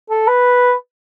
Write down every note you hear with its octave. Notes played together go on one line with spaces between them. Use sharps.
A4
B4